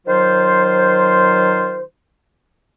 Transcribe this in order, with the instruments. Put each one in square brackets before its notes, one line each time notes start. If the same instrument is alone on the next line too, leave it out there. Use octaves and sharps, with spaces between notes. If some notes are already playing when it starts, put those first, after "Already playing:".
[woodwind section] D#3 F#3 F4 C5